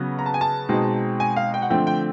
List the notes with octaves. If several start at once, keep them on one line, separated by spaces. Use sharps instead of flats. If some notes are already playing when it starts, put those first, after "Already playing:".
Already playing: C#3 F#3 B3
A#5
A5
G#5
A5
B2 G#3 C4 D#4
G#5
F5
G5
F#5
D3 F3 A3 C4 G5
G5